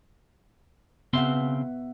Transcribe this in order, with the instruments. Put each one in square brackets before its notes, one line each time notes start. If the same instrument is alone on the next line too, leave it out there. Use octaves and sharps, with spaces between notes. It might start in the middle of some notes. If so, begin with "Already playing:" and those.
[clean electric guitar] C#3 C4 C6 [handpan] B3 E5 F#5